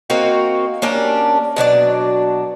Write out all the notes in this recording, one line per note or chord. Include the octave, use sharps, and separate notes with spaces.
A#3 C4 D#4 F#4
A#3 C#4 D4 G4
B2 F#3 D4 D5